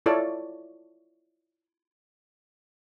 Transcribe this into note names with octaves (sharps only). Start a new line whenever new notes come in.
E4 F4 A4 C#5 D5